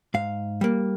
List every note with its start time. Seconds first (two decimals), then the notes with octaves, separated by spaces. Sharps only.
0.14 G#2 F5
0.61 G3 A#3